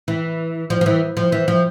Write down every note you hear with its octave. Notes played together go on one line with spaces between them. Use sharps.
E3
F3
F3
E3
F3
E3
F3